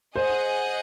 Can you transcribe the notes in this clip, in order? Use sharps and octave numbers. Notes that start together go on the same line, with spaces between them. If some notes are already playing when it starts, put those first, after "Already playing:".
G#4 C5 D#5 F#5